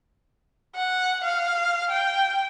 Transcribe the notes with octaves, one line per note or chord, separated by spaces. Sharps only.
F#5
F5
G5